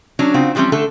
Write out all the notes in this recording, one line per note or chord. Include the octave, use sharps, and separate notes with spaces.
F#3 C#4 D4
C#3 C4 F4 F#4
E3 F3 G3 A#3 C4 C#4
D3 A3 A4 A5